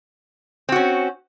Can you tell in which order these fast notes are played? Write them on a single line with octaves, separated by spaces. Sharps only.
C4 F#4 C#4